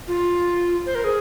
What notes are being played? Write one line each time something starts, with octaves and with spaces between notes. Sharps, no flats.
F4
C5
A#4
G#4